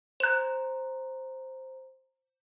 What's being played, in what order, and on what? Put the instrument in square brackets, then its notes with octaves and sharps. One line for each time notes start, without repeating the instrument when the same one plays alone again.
[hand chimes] C5 A#5 [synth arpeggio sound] F#6 E7